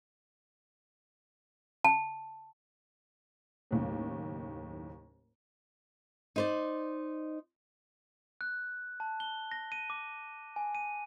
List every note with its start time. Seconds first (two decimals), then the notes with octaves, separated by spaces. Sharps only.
1.84 A5
3.71 F#1 D#2 A2
6.36 D#4 C5 D5
8.41 F#6
9.00 A5
9.20 G7
9.51 A#6
9.72 D#7
9.90 D6
10.56 G#5
10.75 D#7